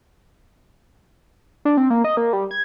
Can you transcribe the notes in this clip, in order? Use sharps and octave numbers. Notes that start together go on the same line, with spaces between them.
D4
C4
A#3
D#5
A#3
G3
G#6